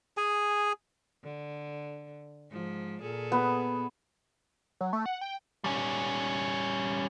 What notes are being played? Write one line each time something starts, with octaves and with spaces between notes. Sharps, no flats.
G#4 G#5
D3
G#2 F3
A#2 G#4 A4
B3
F#3
A3
F#5
G5
G3 C#4